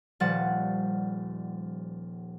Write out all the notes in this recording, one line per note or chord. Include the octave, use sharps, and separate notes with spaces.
D#1 F3 G3 F#5 A6